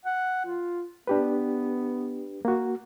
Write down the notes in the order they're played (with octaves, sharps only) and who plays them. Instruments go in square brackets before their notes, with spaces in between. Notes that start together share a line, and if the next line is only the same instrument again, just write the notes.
[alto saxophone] F#5
F4
[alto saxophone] B3 [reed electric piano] D4 G4 B4
[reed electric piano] A#3 F#4